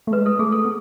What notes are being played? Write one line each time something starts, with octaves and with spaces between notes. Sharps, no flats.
A3
G#3 B4
A4
A3 G#4
A4
B3